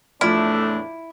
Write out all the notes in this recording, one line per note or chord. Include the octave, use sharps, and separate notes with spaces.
E2 A2 F3 A3 D4 E4 D5 F6